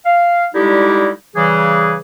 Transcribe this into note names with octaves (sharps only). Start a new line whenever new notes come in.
F5
D3 G3 G#3 D#4 E4 G4
C#3 E3 G3 G#4